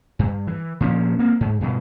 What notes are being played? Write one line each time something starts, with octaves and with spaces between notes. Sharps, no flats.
G2
E3
A#2 F3 C#4
A#3 C4
G#2
G2 B2